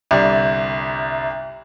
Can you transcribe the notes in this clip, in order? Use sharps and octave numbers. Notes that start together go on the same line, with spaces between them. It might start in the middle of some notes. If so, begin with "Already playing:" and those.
G1 C2 D5